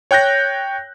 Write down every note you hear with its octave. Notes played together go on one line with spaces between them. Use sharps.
C#5 G5 F#6 G6 A#6